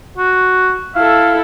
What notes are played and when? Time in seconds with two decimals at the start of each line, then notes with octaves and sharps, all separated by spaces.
0.17 F#4
0.96 E4 A4 F5